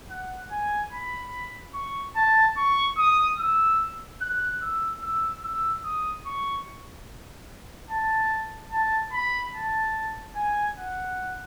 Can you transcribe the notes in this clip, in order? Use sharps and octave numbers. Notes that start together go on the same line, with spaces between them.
F#5
G#5
B5
C#6
A5
C#6
D#6
E6
F#6
E6
E6
E6
D#6
C#6
A5
A5
B5
A5
G#5
F#5